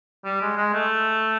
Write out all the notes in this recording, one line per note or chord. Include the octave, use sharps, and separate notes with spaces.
G3
G#3
G#3
A3